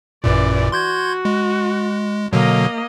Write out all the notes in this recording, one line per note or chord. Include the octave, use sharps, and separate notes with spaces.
A1 F#2 A#2 E3 D5
F#4 C6 G6 G#6
G#3
B2 D3 F#3 A#3 D#5